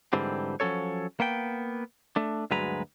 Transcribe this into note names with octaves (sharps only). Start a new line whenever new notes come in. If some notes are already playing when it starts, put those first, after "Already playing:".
G#2 D3 E3 G3 C4
F3 F#3 C#4 A4 C#5
A#3 B3 G5
A3 D4
D2 G2 F#3 G#3 B4 A#5